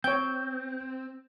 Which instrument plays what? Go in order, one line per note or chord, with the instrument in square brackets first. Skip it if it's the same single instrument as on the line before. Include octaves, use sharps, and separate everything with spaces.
[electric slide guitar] C4 [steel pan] C#5 G5 [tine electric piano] G6